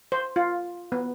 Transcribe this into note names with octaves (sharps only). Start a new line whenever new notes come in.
C5
F4
B3